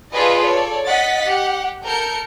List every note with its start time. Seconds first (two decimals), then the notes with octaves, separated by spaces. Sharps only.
0.13 F4 G#4 A4 B4 D5 D#5
0.42 A4 C#5 D5
0.86 D#5 F#5 A6 B6
1.23 G4 F#5
1.85 A4 A#4 G6 C#7